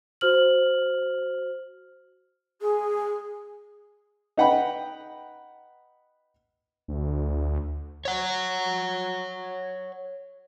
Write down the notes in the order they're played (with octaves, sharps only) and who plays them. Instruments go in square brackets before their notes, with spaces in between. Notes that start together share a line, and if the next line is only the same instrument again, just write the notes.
[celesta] F#4 C5 F6 F#7
[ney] G#4
[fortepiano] D#4 B4 F#5 G5 B5
[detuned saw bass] D2
[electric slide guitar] C#5 F#5